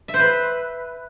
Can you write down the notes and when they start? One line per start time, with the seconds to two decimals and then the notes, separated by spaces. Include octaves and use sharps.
0.08 E5
0.14 C5
0.19 B4